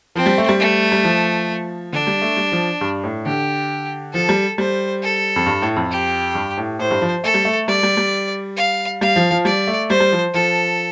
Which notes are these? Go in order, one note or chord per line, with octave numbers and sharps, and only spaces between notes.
F3 C4
G3
A3
G3
A3
G3
F3
D3 D4
G3
A3
G3
F3
G2
A2
D3 G4
F3 A4
G3
G3 C5
A4
F2
G2
A2
F2
G4
G2
A2
A2 C5
G2
F3
A3 A4
G3
A3
G3 D5
G3
G3
F5
G3 F5
F3
F3
G3 D5
A3
G3 C5
G3
F3
F3 A4